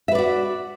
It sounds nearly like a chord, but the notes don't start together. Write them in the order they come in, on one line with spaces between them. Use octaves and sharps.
E5 B4 D5 F#4